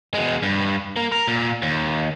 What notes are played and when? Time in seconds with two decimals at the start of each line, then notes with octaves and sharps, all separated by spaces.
0.14 B2 G#3
0.43 G2
0.96 A#3
1.12 A#4
1.28 A#2
1.62 D#2